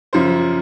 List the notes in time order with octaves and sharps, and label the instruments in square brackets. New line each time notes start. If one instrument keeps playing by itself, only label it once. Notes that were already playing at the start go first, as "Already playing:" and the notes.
[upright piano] F#2 C#3 F3 C5